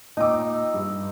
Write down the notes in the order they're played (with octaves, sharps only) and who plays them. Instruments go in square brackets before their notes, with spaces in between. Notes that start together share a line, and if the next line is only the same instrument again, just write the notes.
[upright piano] A#2 G5 D6 [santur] D#4 [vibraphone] D#5 E6
[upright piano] G2